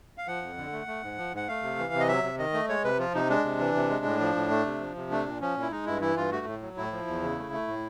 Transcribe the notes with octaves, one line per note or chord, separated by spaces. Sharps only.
F5
F3 F#5
F2
D3
A3
A3
G#2
F3
G#2 F#5
A3 F5
C3
E3
C3
D#5
F#3 E5
C3
D#3 D#5
A3
G#3 C#5
C3 B4
F3 F4
C3 D#4
G#3 D4
C3
E3
C3
G#3
A2
F3
A2
A3
C3
F3
C3
A3 D4
A#2
F3 C#4
A#2
E4
G#3 D#4
G2 E4
E3 E4
G2 F4
A3 F#4
A2
F#3
A2 E4
F3
E2
C#3
A3
A3
A2